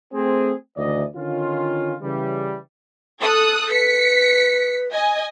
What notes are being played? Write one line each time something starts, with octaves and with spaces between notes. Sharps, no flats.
A3 C4 G#4
D2 D#3 E3 A3 D5 D#5
D3 D#3 C#4 F4
C#3 E3 G3
A4 D#6 F#6
B4 B6 C#7
D#5 G#5